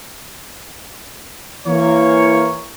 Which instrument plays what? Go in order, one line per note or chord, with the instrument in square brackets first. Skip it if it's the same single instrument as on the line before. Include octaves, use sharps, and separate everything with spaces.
[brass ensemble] E3 A#3 C#5